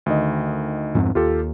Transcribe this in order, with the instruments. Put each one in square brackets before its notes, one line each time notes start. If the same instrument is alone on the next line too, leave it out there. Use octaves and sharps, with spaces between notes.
[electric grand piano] D2 D#3 D#5
[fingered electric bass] F2 G#2 C4
[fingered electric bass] D#2 [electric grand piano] F4 G4 A4